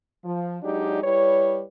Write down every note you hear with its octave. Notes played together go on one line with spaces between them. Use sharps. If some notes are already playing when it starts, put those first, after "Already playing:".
F3
F#3 G#3 D4 D#4 G4 D5
G3 E4 B4 C#5